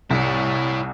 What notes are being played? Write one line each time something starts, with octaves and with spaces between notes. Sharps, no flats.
C2 E4 C#5